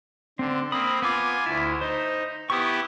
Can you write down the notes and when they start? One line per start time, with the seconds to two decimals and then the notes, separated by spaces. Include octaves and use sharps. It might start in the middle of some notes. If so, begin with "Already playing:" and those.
0.39 D3 C4
0.72 A#3 C4 B5 D#6
1.02 B3 F4 G#5 D6
1.46 D2 E4
1.81 D#4 C5
2.50 B3 E4 G4 C#6 D#6